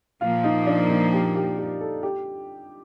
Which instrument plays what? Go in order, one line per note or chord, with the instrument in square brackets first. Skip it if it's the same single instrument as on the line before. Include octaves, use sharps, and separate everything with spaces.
[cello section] A#2 F3 A#3 [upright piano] F4
[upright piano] D#4
D4
D#4
G4
G4
G4
A4
G4